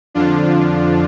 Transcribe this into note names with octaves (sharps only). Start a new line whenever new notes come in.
F2 D3 F3 D4 F4